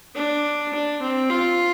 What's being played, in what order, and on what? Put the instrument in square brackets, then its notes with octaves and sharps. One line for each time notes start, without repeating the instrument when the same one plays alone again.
[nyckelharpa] D4
D4
C4
F4